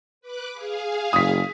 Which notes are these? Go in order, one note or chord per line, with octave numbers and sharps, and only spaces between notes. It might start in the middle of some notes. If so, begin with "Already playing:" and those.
B4 D6 F#6
G#4 F5
F#1 D#6 B6